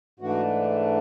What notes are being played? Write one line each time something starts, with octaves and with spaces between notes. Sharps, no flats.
G#2 E3 A3 D4 F#4